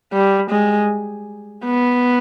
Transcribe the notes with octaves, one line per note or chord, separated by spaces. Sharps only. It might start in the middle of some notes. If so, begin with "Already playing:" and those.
G3
G#3
B3